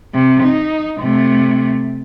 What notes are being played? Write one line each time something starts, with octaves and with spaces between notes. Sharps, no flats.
C3
D#4
C3 A3